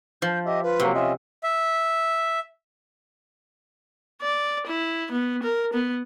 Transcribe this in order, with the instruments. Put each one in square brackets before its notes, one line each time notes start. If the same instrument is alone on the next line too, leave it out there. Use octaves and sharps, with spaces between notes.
[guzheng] F3 [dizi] G6
[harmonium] G4 E5 [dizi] D#5
[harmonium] F4 [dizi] B4
[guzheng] C3 [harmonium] F#3 A#3 F#4
[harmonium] C#4 F4 D#5 [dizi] E5
[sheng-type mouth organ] E5
[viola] D5
E4
B3
A#4
B3